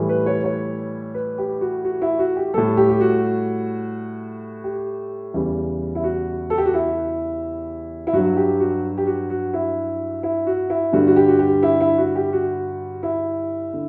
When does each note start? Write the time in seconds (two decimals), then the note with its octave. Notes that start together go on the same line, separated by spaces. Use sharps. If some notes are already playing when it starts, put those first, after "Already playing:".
Already playing: A2 E3 G3
0.09 B4
0.26 C#5
0.44 C#5
1.14 B4
1.38 G4
1.61 F#4
1.85 F#4
2.02 E4
2.19 F#4
2.36 G4
2.54 A2 G3 A4
2.77 G4
2.89 G4
3.01 F#4
4.64 G4
5.34 E2 C#3 E3 G3
5.95 E4
6.04 F#4
6.50 A4
6.58 G4
6.66 F#4
6.74 E4
8.07 E4
8.13 G2 F#3 F#4
8.37 G4
8.60 F#4
8.98 G4
9.07 F#4
9.30 F#4
9.54 E4
10.23 E4
10.47 F#4
10.70 E4
10.93 G2 D3 G3 F#4
11.07 F#4
11.16 G4
11.28 F#4
11.39 G4
11.63 E4
11.81 E4
11.98 F#4
12.15 G4
12.33 F#4
13.03 E4
13.74 D3